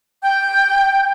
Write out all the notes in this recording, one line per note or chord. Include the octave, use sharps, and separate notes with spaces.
G5 G6